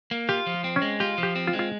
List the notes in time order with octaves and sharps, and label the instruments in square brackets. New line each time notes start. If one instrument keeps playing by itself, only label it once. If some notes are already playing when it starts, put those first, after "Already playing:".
[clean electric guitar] A#3
[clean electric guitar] F4 [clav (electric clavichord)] G4
[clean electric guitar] F3
C4
[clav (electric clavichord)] C#4
[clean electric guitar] G#3
[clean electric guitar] F4 [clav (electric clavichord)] G4
[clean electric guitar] F3
[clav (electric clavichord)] G4
[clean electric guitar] C4
[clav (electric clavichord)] F4
[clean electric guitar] G#3
[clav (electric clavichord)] F4